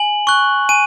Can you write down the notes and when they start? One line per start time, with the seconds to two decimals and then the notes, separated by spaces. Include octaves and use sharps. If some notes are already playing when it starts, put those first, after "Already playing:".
Already playing: G#5 F#7
0.27 C#6 F#6
0.69 G#5 D#7